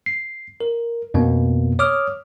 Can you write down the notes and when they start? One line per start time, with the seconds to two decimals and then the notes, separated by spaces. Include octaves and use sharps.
0.06 C7
0.60 A#4
1.14 F2 B2 A#3 B3
1.79 C#5 D6 D#6 F6